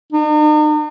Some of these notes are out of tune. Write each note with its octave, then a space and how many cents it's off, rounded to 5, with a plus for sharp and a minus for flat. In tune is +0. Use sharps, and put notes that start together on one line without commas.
D#4 -45